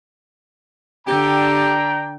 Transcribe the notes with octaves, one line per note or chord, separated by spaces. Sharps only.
D3 D4 G4 G5 A#5